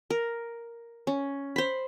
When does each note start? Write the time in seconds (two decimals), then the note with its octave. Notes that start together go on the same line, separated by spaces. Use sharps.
0.10 A#4
1.07 C#4
1.56 C5 B5